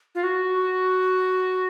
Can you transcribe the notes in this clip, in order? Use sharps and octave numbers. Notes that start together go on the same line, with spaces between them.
F4
F#4